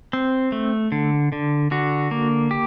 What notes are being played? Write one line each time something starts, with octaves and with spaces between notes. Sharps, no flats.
C4
A3
D3
D3
D3 F#4
A#3
G4